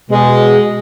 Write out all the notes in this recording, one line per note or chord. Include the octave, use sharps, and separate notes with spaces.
B2 G#3